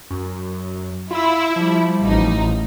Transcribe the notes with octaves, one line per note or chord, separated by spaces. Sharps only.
F#2
E4 F4 B5 E6
F3 G3
A1 D#4